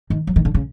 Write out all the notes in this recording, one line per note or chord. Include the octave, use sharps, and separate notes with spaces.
D#3
F#3
D#3
D3
C#3